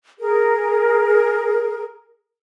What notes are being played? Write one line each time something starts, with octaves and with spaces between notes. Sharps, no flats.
G#4 A#4